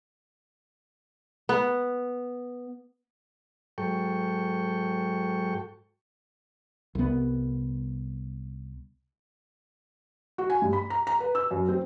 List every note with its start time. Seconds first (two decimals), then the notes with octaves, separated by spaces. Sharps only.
1.49 B3
3.78 G#2 F#3 A4 G5 C#6
6.95 C2 B3
10.38 F#4
10.50 G#5
10.62 G2
10.73 B5
10.90 A#5
11.07 A#5
11.20 B4
11.35 E6
11.51 F#2
11.68 C4